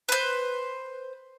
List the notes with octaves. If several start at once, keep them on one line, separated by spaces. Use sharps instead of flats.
B4 C5